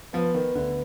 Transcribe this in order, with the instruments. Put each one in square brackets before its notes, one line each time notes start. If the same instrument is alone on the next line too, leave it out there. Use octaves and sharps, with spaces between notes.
[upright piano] F3 [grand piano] B3
[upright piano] D#3
[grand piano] D2 [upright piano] D3